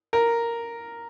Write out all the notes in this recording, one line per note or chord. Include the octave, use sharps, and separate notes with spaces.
A#4